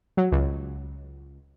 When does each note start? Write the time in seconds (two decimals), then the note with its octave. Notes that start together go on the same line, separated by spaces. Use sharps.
0.17 F#3
0.32 C#2